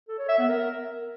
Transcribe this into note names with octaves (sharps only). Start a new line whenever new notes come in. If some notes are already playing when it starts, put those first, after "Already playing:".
A4
C#5
E5
B3
A#4